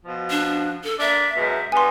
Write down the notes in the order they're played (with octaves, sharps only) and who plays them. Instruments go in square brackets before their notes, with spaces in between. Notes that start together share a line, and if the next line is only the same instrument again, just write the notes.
[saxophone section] B2 F3
[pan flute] D4
A4
[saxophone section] A#3 D4 D5 [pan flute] E5
[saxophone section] F#2 B2 G#3
[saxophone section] G2 B3 [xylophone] G#5 C6